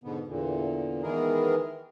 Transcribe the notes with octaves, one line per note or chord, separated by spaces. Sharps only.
G#2 B2 D3 B3
E2 A#2 D3
D#3 E3 G#3 B3 G#4 A#4